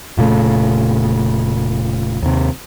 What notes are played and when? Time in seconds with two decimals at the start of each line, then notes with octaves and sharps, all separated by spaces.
0.17 F1 A#2 C#3 A3
2.22 D#2 C3